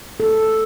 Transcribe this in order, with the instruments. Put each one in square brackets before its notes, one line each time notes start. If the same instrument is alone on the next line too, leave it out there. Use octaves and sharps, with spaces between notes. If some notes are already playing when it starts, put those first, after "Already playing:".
[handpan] A4